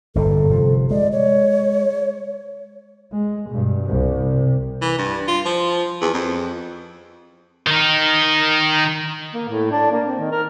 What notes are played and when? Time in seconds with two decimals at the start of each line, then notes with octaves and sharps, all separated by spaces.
0.15 G1 G2 A#2 A4
0.50 C3 F3
0.91 G#3 D5
1.12 C#5
3.12 G#3
3.50 G2 B2
3.84 C2 C3
4.27 C3
4.82 E3
4.98 G2
5.28 F4
5.45 F3
6.02 E2
6.14 F2
7.67 D#3 D#4
9.34 A#3
9.49 A2
9.71 D4
9.91 A#3
10.07 C4
10.19 D#3
10.31 A#4